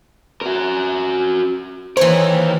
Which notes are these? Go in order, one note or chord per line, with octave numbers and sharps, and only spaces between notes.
F#4 A#4
D#2 E3 A#4 C5 C#5